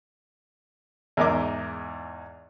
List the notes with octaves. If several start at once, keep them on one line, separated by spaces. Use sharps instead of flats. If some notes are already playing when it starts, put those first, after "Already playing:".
E2 G#2 A#4 D#5 E5 D6